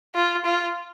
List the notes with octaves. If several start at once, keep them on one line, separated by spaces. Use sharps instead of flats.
F4
F4